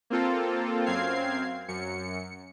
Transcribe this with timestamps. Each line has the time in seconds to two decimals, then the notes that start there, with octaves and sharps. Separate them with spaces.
0.10 A#3 C4 F4 A4
0.86 F#2 C4 F5 G#6 C7
1.68 F#2 C#7